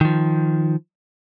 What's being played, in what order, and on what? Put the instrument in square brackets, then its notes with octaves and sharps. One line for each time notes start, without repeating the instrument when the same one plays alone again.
[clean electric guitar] D#3 F3